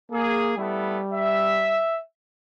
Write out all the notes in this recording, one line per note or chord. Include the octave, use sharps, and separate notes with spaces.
A#3 G#4
G3 A3 B3 E4
E5